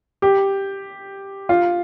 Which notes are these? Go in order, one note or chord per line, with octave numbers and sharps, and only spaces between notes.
G4
F4